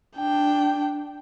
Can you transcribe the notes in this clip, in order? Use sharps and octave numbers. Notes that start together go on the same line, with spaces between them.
D4 G5